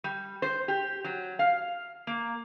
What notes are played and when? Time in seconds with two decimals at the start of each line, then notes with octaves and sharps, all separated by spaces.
0.04 G3
0.42 C5
0.68 G4
1.04 F#3
1.39 F5
2.07 A#3